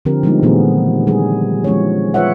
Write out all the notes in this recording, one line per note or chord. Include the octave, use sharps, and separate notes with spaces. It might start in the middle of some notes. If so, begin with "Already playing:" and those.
D3 F3 C4 G4 A#4
F3 G3 G#3 B3 D4 D#4
A#2 D#3 E3 A3 B3 G#4
G3 G#4
F3 G#3 C#4 E4 C#5
F4 B4 C#5 E5 F#5